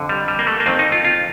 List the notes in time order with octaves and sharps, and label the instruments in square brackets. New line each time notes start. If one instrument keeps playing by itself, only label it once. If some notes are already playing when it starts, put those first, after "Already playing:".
Already playing: [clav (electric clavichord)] F2 D3
G3
G3
A#3
A3
A#3
F2 D#3 C4
D#4
F4
F4